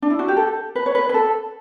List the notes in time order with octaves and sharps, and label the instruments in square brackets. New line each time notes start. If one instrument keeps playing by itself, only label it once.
[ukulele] D4
E4
F#4
G4
A4
B4
C#5
B4
B4
A4